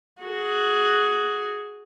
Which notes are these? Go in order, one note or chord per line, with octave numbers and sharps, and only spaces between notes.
F#4 G#4